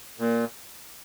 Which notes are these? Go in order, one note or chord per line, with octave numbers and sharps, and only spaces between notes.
A#2